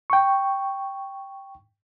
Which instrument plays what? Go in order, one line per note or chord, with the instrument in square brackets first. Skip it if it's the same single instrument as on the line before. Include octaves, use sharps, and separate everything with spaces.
[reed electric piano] G5 C#6